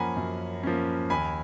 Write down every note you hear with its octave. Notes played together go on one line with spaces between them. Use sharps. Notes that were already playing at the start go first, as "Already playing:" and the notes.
Already playing: F#2 F3 A#3 C#4 F#5 G#5 A#5 B5
F#2
F3 A#3 C#4
D#2 G#5 B5